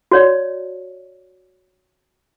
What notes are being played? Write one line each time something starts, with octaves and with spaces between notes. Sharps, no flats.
F#4 C#5 D5